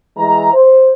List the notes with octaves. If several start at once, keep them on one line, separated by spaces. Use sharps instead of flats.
E3 G#3 E5 A#5
C5